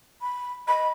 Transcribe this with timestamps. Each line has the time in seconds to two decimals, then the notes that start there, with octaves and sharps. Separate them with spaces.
0.22 B5
0.68 D#5 B5